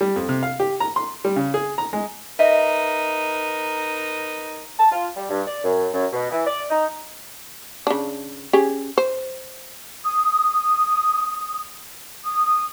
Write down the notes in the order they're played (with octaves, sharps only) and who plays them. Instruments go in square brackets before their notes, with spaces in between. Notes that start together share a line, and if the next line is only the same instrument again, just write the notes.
[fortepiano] G3
F2
C3
F5
G4
A#5
C6
G3
C#3
G#4
A#5
G#3
[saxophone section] D#4 A#4 B4 [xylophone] D#5 E5
[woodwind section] A5
F4
G3
G2
D5
F#2
F#2
B2
E3
D5
D#4
[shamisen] C#3 D4
C#4 G4 G#4
C5
[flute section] D#6
D#6